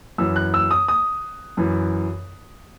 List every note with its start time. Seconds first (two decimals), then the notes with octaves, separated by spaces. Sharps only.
0.18 F#2 E3 E6
0.36 F#6
0.54 E6
0.71 D#6
0.88 D#6
1.57 F#2 E3